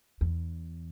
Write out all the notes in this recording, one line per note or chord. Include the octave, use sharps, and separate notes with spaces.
E2